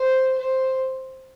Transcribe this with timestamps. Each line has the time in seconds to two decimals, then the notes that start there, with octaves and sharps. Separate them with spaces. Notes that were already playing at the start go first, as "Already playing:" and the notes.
Already playing: C5
0.38 C5